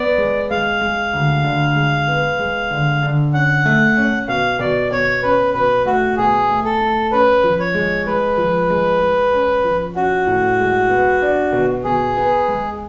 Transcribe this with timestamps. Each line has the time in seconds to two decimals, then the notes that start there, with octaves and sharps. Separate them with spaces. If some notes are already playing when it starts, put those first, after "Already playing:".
Already playing: B3 D5
0.18 G#3
0.51 G#3 F5
0.81 G#3
1.13 D2
1.44 D3
1.76 G#3
2.08 B3
2.39 G#3
2.71 D3
3.03 D3
3.33 C#4 F#5
3.65 A3
3.96 C#4
4.28 B2 F5
4.59 B2 D5
4.91 B2 C#5
5.23 C#4 B4
5.54 B2 B4
5.86 A3 F#4
6.17 B2 G#4
6.49 A3
6.64 A4
6.80 A3
7.12 C#4 B4
7.43 F3
7.59 C#5
7.74 G#3
8.06 G#3 B4
8.37 F3
8.70 G#3
9.00 G#3
9.33 C#4
9.64 F3
9.95 C#4 F#4
10.27 A2
10.59 G#3
10.90 B3
11.22 D4
11.53 B2
11.84 B2 G#4
12.17 B3
12.48 G#3